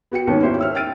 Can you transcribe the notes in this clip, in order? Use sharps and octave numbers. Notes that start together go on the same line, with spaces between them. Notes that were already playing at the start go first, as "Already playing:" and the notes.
B3 F#4 G5 C#7
D#2 G#2 A#3 B3 C#4
C#4 D#4 E4 F#4 G4 C5
E5 E6 F6
G5 F6 A6 D7 D#7